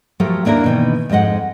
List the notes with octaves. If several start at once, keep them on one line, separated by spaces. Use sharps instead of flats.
F3 F#3 A3 G4 A4 A#4
D#2 A#3 D4 E4 A#4
B2 D#3 E3
F2 G#2 G#3 D#5 F#5